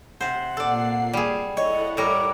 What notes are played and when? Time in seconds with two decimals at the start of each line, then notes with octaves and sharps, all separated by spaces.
0.21 C3 C5 F#5
0.57 A#2 A#3 A4 D5 C7
1.13 G3 G#4
1.57 E4 A4 C#5 D#5 F#5
1.97 A2 G3 A#4 D6